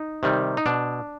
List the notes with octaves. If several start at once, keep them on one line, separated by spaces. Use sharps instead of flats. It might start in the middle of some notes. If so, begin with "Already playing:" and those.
Already playing: D#4
C3 D#3 G3
D#4
B2 D4